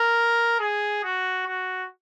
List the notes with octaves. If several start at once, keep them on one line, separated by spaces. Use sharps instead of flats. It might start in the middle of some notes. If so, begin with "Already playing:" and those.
Already playing: A#4
G#4
F#4
F#4